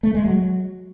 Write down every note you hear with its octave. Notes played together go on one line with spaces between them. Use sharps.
A3
G#3
F#3